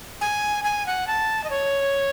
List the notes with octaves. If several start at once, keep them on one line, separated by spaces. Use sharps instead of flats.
G#5
G#5
F#5
A5
D#5
C#5